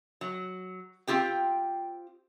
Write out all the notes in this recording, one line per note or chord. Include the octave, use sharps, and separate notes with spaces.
F#3
C4 F4 G4 G5